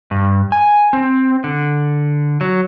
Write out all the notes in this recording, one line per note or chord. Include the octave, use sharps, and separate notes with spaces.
G2
G#5
C4
D3
F#3